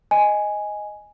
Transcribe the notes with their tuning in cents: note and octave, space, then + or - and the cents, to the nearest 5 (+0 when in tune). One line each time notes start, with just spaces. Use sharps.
D#5 +0 G#5 +0